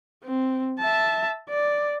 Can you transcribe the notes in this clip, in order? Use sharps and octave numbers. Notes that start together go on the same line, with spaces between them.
C4
E5 A5
D5